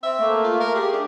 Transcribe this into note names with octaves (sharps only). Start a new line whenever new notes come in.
C4 E5
A3 A#3
F4
A#4
G4 G#4
A3 D4